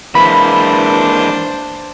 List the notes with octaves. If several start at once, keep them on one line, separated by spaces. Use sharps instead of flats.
E3 G#3 A#3 D4 C5 B5